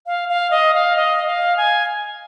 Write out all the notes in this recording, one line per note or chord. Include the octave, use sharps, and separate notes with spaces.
F5
F5
D#5
F5
D#5
F5
G#5